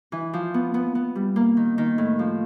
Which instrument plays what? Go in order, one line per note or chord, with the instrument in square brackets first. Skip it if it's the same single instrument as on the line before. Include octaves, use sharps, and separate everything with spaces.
[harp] E3
F3
B3
B3
B3
G3
A#3
D#3
D#3
A2
F3